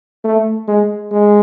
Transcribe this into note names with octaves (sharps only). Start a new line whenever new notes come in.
A3
G#3
G#3